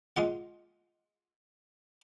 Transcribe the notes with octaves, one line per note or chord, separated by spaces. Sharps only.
G#3 F4 F#5